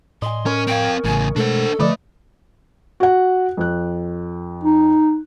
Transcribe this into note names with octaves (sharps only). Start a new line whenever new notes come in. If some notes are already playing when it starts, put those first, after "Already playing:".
A2 D#5 G#5 C6
C#4 A#4 C#5
C4 F5 G5
A1 A2 C#3 G#5
B2 G#3 A3 D4 A4 C5
D3 F3 A3 B4 D5 D#5
F#4 F#5
F2 F#6
D#4